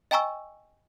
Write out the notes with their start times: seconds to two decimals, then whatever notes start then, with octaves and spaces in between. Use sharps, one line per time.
0.11 D#5 G5 G#5 A#5 C#6 E6